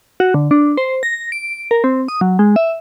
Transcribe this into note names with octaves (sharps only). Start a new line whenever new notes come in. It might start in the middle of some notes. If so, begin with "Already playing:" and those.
F#4
D3
D4
C5
A#6
D7
A#4
C4
D#6
F#3
G#3
E5